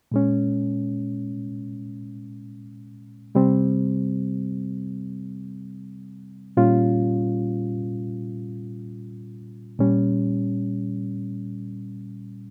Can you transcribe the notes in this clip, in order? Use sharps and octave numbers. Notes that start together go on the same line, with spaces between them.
A#2 G#3 C#4
C3 G3 C4
A#2 G3 C#4 F4
A#2 G3 C#4